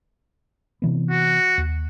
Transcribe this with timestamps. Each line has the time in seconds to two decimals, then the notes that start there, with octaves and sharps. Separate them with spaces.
0.82 C3 E3 B3
1.11 F#4
1.58 D#2